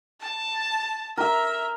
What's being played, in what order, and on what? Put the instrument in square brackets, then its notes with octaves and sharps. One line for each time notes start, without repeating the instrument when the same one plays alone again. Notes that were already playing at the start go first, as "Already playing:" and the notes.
[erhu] A5
[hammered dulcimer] A#4 [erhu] E5